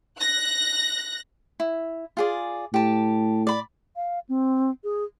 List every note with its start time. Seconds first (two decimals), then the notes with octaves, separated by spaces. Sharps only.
0.19 F#6 A#6
1.60 E4
2.17 F4 G#4 D5
2.74 A2 G4 A5
3.47 D5 B5
3.96 F5
4.29 C4
4.84 G#4